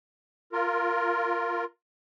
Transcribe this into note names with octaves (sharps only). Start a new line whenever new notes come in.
F4 A#4